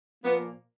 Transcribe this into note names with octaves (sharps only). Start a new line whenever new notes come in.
A#2 F3 A#3 B3